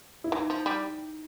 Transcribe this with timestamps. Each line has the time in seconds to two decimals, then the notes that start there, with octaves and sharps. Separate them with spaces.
0.24 E4
0.32 E3 D#4
0.50 F3
0.66 G3